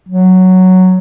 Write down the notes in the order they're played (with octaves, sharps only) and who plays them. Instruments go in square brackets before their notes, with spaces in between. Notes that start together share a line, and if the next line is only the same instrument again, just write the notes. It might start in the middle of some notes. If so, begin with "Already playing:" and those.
[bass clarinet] F#3